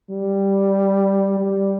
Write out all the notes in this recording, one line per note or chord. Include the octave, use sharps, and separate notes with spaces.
G3
G3